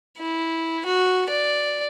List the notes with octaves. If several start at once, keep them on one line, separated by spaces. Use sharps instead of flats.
E4
F#4
D5